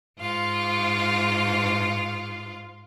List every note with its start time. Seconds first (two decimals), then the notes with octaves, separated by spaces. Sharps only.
0.17 G#2 F4 F5